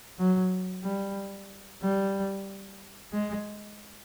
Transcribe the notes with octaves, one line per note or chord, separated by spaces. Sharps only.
F#3
G3
G3
G#3